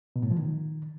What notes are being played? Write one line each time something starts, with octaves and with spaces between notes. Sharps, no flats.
B2
A2
F3
D#3